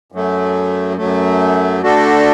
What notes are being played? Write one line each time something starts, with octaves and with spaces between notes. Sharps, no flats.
F#2 F#3 A3
F#2 F#3 A3
D3 A3 D4 F#4 A4